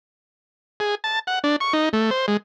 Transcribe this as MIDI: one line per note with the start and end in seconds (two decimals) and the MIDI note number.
0.80 0.95 68
1.04 1.19 81
1.27 1.39 78
1.44 1.56 62
1.61 1.73 85
1.73 1.89 63
1.93 2.10 57
2.11 2.26 72
2.28 2.37 56